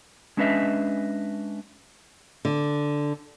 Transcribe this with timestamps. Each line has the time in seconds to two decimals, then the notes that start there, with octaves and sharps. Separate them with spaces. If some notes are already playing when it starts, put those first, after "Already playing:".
0.37 G#3 C#4 D4 B4 D#5 E5
2.45 D3